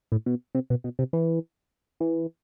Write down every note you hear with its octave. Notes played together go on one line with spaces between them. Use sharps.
A2
B2
C3
B2
B2
C3
E3
E3